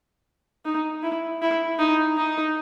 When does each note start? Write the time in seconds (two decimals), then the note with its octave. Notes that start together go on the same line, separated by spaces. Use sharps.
0.65 D#4
1.03 E4
1.42 E4
1.79 D#4
2.17 D#4